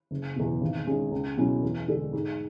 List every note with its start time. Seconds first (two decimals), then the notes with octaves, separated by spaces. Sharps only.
0.11 F#1
0.36 E2 B2
0.61 G#1
0.87 G#2 G#3 C#4 G#4
1.11 C#2
1.37 B2 F#3 C#4 E4
1.62 E2
1.88 D3 G#3 D4 A4
2.13 G#2